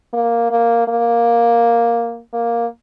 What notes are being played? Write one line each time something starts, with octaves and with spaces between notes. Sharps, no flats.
A#3
A#3
A#3
A#3